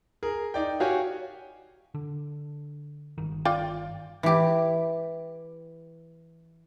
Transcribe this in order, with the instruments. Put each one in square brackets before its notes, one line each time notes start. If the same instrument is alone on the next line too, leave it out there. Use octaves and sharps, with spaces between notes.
[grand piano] G#4 A#4
D#4 D5 G5
F#4 G4 C#5 F5 G5 G#5
[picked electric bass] D3
G1 D#3
[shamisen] F4 D5 G5
[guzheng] E3 G4